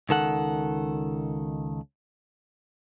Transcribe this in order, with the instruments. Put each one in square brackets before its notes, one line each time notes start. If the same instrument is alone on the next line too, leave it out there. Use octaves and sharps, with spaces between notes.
[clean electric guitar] C#2 D#3 A4 F#5